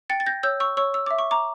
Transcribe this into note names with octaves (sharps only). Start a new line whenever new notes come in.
G5 A6 C#7
A6
G6 A#6
C#5 E6 G6
C#6 E6
C#5 C#6 E6
E6
E5 D6
C#6
A#5 D6